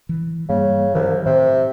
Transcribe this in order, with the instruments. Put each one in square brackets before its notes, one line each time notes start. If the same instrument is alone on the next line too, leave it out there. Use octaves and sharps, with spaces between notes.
[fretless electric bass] E3
[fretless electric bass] G2 G3 A#3 [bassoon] C#3
[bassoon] C2 [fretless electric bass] D#3 E3 F#3
[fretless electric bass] A2 [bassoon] C3